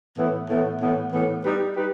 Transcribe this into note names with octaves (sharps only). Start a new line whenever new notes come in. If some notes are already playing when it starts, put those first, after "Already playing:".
A2 E3 B3
A2 E3 B3
A2 E3 B3
A2 E3 B3
G3 D#4 G4 B4
G3 D#4 G4 B4